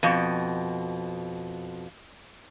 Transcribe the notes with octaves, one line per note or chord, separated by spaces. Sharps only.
F2 B2